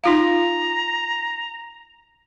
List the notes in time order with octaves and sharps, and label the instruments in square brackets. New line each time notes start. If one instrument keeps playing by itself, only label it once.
[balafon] D#4 F4 F5 [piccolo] A#5